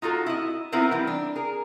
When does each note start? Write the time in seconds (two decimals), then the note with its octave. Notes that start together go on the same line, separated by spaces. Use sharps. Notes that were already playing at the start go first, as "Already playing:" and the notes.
0.02 D#4 F4 F#4 A4
0.26 E4 D#5
0.72 B3 C4 D#4 E4 A#4 B4
0.91 E3 G3
1.07 D4
1.36 G#4 A#4